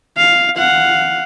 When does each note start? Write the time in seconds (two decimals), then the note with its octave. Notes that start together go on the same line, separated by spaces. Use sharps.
0.17 F5
0.57 F5 F#5